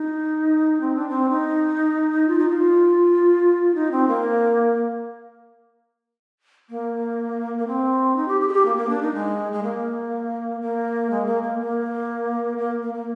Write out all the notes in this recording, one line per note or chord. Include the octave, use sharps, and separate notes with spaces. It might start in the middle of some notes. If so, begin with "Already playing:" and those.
Already playing: D#4
C4
D4
C4
D#4
F4
D#4
F4
D#4
C4
A#3
A#3
A#3
C4
D#4
G4
G4
G#4
G4
A#3
A#3
D4
D#4
G#3
G#3
A#3
A#3
G#3
A#3
A#3
A#3
A#3
A#3
A#3